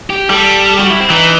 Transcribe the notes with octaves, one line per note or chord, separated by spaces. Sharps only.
G4
G3 A4
F#4
E4
C4
E3 D#4